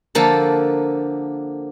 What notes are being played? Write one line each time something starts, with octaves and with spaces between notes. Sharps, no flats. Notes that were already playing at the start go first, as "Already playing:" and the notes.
D3 F3 A#3 A4